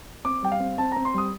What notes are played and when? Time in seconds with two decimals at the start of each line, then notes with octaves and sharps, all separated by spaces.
0.25 C4 D6
0.43 G3 G5
0.52 F5
0.60 C4
0.78 C4 A5
0.92 C4 A#5
1.05 C6
1.14 G3 D#6